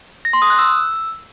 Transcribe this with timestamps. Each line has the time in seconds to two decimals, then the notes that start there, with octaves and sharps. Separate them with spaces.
0.25 A#6
0.33 C6
0.42 D#6
0.50 F#6
0.59 E6